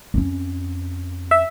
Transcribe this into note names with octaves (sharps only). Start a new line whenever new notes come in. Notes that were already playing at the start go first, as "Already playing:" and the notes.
F2 C#4
E5